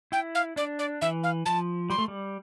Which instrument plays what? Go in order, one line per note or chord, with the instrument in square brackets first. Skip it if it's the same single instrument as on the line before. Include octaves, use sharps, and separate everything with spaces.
[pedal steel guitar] E4 [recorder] G5
[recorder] F5
[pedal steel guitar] D4 [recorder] D5
[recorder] D5
[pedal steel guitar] E3 [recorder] E5
[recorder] F5
[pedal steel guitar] F3 [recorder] A5
[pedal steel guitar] G3 [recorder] C6
[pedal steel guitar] A3
G3